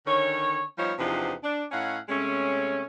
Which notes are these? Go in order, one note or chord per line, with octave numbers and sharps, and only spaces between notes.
D3 D#3 C#4 C#5
F3 G3 B3 D#4 C5 C#5
E2 C3 F3 B3 D4 D#4
D4
A2 C#4 D#4 F5 F#5
C3 G#3 A3 C#4